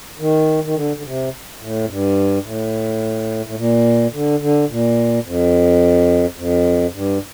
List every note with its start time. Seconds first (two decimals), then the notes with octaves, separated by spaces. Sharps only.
0.19 D#3
0.64 D#3
0.75 D3
0.96 D3
1.04 C3
1.60 A2
1.84 F2
1.88 G2
2.44 A2
3.46 A2
3.57 A#2
4.13 D3
4.40 D3
4.69 A#2
5.25 F2
6.36 F2
6.93 G2